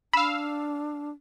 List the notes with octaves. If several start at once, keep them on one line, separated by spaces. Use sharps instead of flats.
D4 F5 B5 E6